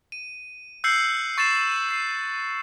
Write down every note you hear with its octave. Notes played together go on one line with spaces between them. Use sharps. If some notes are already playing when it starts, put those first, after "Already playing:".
D#7
E6 F#6 G6 C7 C#7 F#7
C#6 A6 C7 E7
G6 C7